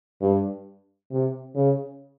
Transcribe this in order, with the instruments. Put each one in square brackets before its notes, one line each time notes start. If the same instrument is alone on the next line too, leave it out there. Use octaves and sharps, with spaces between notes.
[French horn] G2
C3
C#3